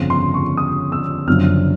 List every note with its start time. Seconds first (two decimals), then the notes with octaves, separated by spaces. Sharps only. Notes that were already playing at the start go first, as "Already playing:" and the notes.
Already playing: G1 F2 C#3 F3
0.10 C6
0.34 C#6
0.57 D#6
0.92 E6
1.27 F#1 F#2 D3 F3 F6